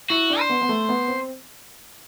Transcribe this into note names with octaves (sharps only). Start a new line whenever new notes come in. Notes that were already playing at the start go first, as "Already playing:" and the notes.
E4 F#4
D4
C5
B3
B3
A3
B3
C4